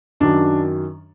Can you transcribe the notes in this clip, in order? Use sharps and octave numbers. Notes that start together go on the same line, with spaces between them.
F#2 D#3 F#3 D4